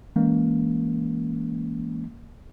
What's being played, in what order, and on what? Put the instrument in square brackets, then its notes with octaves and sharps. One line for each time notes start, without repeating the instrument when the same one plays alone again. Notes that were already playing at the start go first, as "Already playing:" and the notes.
[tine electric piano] E3 G#3 A#3 C#4